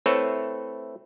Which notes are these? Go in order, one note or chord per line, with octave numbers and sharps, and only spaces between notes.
A3 C4 E4 A4 B4 C#5